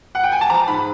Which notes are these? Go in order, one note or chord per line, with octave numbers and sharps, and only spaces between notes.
F#5
G5
G#5
A5
F3 A#5
G#2 B5